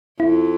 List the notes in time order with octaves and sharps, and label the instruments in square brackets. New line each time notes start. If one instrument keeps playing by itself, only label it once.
[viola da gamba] F2 [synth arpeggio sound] E4